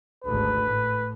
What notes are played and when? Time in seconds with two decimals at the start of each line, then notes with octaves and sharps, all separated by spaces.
0.24 G#1 D2 B4
0.64 A2